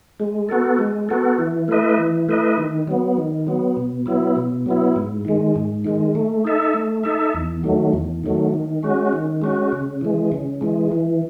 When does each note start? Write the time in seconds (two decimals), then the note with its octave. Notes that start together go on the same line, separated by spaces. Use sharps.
0.20 G#3
0.49 B3 F#4 A4
0.79 G#3
1.09 B3 F#4 A4
1.38 E3
1.68 A3 E4 B4 D#5
1.97 E3
2.28 A3 E4 B4 D#5
2.57 D#3
2.87 F#3 B3
3.18 D#3
3.47 F#3 B3
3.77 B2
4.06 F#3 B3 E4
4.36 B2
4.66 F#3 B3 E4
4.96 G#2
5.25 D#3 G#3
5.56 G#2
5.84 D#3 G#3
6.15 A3
6.44 D#4 A4 E5
6.74 A3
7.03 D#4 A4 E5
7.34 E2
7.63 D#3 F#3 A3
7.93 E2
8.23 D#3 F#3 A3
8.54 D#3
8.83 G#3 C#4 F#4
9.13 D#3
9.42 G#3 C#4 F#4
9.72 C#3
10.01 E3 G#3
10.32 C#3
10.61 E3 G#3
10.92 E3